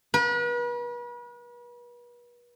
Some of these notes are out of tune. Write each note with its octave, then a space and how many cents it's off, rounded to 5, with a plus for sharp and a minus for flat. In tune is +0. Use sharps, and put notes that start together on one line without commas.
B4 -40